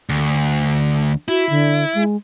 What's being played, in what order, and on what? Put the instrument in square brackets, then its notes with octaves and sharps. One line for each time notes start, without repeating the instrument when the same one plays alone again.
[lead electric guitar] D2
[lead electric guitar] E4 [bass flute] F#4
[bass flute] D3
G#3